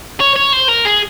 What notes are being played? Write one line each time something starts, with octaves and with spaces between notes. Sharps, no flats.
C#5
C#5
C5
A#4
G#4